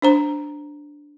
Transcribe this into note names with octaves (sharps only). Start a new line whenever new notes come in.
D4 C5 A#5